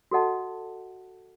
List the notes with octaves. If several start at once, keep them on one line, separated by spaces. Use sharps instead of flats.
F#4 A4 D#5 F#5 A5